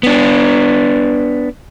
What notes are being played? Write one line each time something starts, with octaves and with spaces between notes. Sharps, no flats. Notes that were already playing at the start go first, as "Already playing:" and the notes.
B3 D4